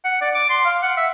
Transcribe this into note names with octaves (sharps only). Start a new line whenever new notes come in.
F#5
D5
D6
C6
F5
F#5
E5